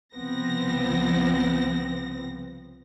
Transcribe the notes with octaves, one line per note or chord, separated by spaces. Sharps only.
C2 C#3 F3 B3 C4 A#6